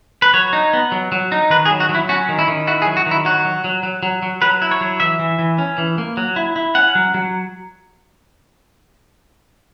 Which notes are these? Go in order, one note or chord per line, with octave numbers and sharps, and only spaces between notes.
B4
F#3 C#5
D#4
B3
F#3
F#3
D#4
D#3 B4
G#4
F#3
F#4
F#3
E4
C#4 F#4
D#3
E4
D#3
E4 F#4
G#4
F#3
F#4
D#3
E4
F#3 F#4
F#3
F#3
F#3
F#3
F#3
F#3 B4
E4
C#5
F#3
E3 E5
E3
E3
C#4
E3
A#3
F#3
E4
E4
C#4 F#5
F#3
F#3